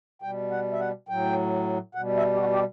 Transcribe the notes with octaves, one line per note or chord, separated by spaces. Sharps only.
B2 G3 G5
F#5
E5
F#5
A2 F#3 G5
B2 G3 F#5
E5
G4
F#4
G4